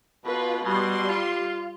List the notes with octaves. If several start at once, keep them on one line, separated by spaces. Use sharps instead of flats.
B2 F4 B4
B2 G3 C6
F4